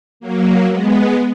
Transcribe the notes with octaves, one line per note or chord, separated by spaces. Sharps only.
F#3 A#3
G#3 B3